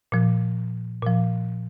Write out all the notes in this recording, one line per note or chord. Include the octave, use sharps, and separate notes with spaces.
A#2 F3
A#2 F3